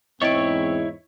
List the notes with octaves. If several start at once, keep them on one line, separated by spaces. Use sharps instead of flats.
E2 G#2 C4 E4 C#5 D#5 C#6 D7